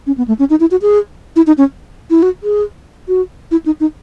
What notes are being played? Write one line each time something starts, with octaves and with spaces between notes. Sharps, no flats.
C#4
B3
A3
C#4
D#4
E4
F#4
G#4
E4
D#4
C#4
E4
F#4
G#4
F#4
E4
D#4
D#4